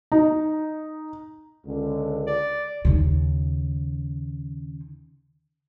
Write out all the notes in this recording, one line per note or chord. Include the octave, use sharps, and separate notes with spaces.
D#4
C#2 D3
D5
D#2 C#3